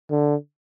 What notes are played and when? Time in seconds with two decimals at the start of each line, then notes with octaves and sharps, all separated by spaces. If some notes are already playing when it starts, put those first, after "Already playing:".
0.10 D3